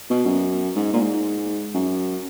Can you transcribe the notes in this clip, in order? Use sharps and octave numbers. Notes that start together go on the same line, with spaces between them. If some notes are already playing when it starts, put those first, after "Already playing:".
B2
F#2
G#2
A#2
G#2
F#2